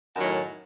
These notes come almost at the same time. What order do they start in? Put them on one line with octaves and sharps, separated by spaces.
F#2 D#3 F#3 A2